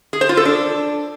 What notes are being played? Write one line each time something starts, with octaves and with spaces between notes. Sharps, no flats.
G#4
C5
F4
A4
D4